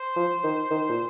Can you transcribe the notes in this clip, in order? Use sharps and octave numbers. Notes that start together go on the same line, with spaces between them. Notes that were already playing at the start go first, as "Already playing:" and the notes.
Already playing: C5
F3
D#3
D#3
A#2